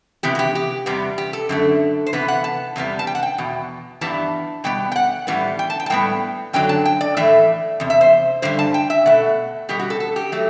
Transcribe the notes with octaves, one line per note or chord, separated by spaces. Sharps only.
C3 E3 B3 G4
F#4
G4
G4
E2 C3 G3 B3
G4
A4
F#2 D3 A3
C5
C3 E3 B3 B4
F#5
A5
E2 C3 G3 B3
A5
G5
F#5
G5
E2 B2
G2 E3 G3 B3 A5
B2 G3 B3 G5
G5
F#5
A2 E3 G3 B3
G5
A5
G5
A5
A2 G3 B3 G5
F#2 D3 F#3 G5
A5
G5
D5
A2 E3 A3 E5
E2 C3
E5
C5
G2 D3 G3 C5
A5
G5
E5
B2 A3 F#5
B2 G3 B3 G4
F#4
A4
A4
G4
F#3 A3